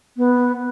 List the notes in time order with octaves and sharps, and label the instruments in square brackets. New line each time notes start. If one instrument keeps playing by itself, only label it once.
[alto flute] B3